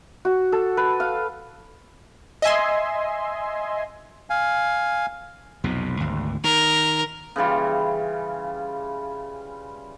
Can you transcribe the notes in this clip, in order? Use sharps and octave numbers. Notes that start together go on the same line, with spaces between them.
F#4
A4
B4
F5
D#5 E5 G#5 C6
F5 G#5
B1 F2 C3
G#1 D2
D#3 A#4
C#3 E3 G3 F4